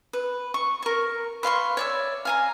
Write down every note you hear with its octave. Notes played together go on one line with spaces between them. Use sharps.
B4
C#6
A#4 C#6
B4 F5 C6 C#6
C#5 D5 E5
F5 G#5 A#5